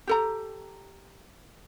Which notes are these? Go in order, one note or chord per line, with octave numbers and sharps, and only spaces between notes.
G4 A4 A#5